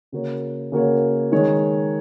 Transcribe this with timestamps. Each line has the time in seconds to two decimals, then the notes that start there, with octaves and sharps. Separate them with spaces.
0.12 C#3 A#3 F#4 A#4 C#5
0.72 C#3 A#3 F#4 A#4 C#5
1.32 D#3 G#3 D#4 G#4 C#5